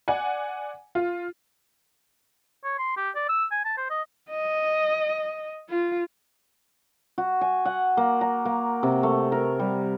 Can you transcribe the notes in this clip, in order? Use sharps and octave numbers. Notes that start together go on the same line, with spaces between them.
D5 F#5 G#5
F4
C#5
C6
G4
D5
E6
G#5
A5
C5
D#5
D#5
F4
F#4
G#5
F#5
A#3
A#5
A#3
C3
A3
A#4
G3